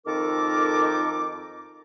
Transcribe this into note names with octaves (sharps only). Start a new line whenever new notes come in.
F2 D#3 D#4 A4 A#4 D6